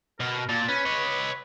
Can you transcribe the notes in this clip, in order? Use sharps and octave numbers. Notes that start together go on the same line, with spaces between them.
B2 A#4
A#2 A5
C#4 B4
C#5 D#5